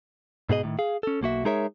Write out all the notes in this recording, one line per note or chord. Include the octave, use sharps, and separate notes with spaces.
G#2 B2 G#4 D#5
A2 C3 D#3
G#4 F5
C#4 A4
B1 A#3 F#4 E5
G#3 D#4 G#4 A#4 C#5 E5